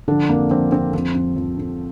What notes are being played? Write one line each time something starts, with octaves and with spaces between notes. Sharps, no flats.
D3 F3 D4
F2 A#3
F3 C4
F2 C4
F3 C4
F2
F3
F2